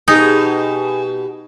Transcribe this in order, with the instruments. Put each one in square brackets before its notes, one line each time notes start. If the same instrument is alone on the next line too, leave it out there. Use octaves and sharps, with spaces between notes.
[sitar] B2 G4 [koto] D#4 [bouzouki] G#4